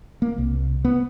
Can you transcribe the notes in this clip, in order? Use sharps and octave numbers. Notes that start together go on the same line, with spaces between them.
A#3
C2
B3